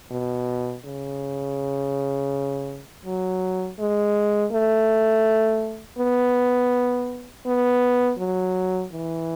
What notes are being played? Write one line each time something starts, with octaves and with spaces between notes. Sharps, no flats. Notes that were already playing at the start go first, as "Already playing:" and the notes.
B2
C#3
F#3
G#3
A3
B3
B3
F#3
E3